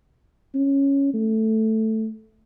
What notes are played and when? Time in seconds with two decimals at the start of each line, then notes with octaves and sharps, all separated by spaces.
0.54 C#4
1.14 A3